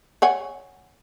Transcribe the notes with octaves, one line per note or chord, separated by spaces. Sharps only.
C#5 F#5 G#5